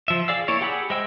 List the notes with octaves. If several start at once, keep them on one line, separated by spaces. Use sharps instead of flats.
F3 E5
G#4 D5 F5 E6
A#3 E4 C#5 D5 E5
G4 G#4 F#5 B5 E6
G#3 C5 E5 G5 E6